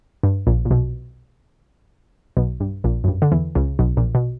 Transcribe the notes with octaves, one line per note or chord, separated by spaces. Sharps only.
G2
A#1 A#2
A#2
B1 B2
B1 B2
G2
A#1 A#2
F#2
G2
D3
E2 E3
C#2 C#3
B1 B2
A#1 A#2
B2